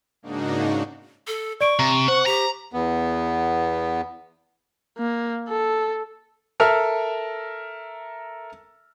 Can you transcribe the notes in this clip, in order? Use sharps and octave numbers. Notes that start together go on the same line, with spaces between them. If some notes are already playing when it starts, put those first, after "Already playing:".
G#2 C#3 A#3 D4 D#4 F#4
A4
D5 C#6 D7
C3 A#5
C5 F#5
G4 A#5
E2 B3
A#3
A4
A4 A#4 E5 F6